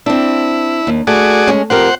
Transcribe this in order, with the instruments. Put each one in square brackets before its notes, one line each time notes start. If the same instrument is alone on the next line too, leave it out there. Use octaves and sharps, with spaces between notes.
[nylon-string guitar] C4 D4 [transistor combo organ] E4
[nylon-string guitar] D#2
[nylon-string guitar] A3 [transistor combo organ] F#4 G#4 D5
[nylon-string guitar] G#3 C#4
[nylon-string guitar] F2 G4 A#4 [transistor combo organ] C5 F#5